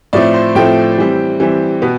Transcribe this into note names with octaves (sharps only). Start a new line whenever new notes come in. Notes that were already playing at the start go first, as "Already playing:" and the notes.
A2 F3 A3 C4 D5
C5
A2 F3 A3 C4 G5
E3 G3 C4
E3 G3 C4
B2 B3